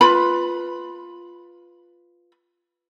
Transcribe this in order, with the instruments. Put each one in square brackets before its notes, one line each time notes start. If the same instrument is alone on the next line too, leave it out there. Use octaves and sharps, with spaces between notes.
[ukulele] F4 B4 B5